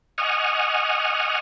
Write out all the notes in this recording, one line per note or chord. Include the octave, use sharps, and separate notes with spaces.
D#5 F#5 G#5 C#6 D#6 F6